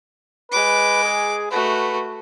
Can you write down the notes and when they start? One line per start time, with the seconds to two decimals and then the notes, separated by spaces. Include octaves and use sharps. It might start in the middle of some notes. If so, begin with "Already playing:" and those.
0.52 G#3 B4 D6
1.04 G#4
1.51 A3 F#4 B4